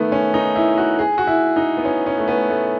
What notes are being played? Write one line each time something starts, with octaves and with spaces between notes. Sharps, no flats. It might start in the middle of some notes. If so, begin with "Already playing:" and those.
Already playing: D#3 A3 B3
C#4
D#4
E4
F#4
G#4
F#4
E4
D#4
B3
C#4
C#4
A3
B3
A3